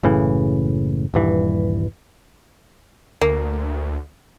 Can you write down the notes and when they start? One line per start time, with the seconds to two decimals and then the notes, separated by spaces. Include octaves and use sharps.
0.03 F#1 A2 C#3 E3
1.14 D#1 G2 E3
3.21 D2 A#3